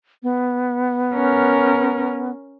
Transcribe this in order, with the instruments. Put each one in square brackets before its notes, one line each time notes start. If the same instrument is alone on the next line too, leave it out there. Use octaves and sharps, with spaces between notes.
[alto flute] B3
[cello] C#4 A#4